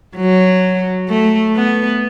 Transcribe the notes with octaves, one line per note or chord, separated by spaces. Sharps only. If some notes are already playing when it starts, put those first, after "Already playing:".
F#3
A3
B3